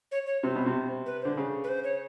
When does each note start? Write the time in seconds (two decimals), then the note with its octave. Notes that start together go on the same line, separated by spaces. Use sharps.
0.12 C#5
0.26 C#5
0.43 C3 C5
0.55 B2
0.66 C3
1.06 B4
1.22 D3 C5
1.37 C#3
1.64 B4
1.69 C5
1.84 C#5